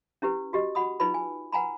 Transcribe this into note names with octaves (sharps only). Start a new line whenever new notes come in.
C#4 E4 G4 B4
F#4 G4 D#5
F#4 F#5 B5 D#6
D#4 F4 B4 B5
G#5
B4 F#5 G#5 A#5 B5